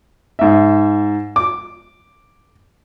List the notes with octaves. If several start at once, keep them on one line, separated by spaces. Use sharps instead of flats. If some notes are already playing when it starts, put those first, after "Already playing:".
G#2 E5
D6